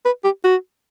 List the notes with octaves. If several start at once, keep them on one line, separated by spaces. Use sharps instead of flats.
B4
G4
F#4